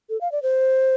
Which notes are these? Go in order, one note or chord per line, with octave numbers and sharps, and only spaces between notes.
A4
F5
D5
C5